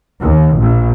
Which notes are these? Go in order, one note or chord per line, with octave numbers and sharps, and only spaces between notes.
D#2
A#1